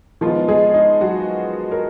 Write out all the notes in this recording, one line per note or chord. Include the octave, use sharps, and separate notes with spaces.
D#3 F3 G#3 B3 F4
G#3 G#4
D#4
F#3 F#4
A#4